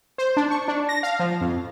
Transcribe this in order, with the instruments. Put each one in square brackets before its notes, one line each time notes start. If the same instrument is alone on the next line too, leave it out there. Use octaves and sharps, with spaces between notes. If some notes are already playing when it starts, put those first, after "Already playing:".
[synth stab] C5
D4
C#6
D4
A#6
F5
F3
F2